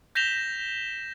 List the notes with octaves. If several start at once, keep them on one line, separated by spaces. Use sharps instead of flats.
G6 A#6 B6 E7 F7 G7